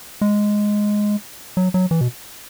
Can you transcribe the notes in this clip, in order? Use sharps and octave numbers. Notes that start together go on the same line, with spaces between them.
G#3
F#3
F#3
E3
B2